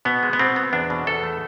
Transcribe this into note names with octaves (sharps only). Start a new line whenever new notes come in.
B2 B3
G#3
B3
B2 C4
B3
E2 D4
B2
E2 A4
A3